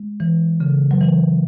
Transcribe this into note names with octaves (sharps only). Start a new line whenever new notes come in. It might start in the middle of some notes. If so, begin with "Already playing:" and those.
Already playing: G#3
E3
C#3
F#3
E3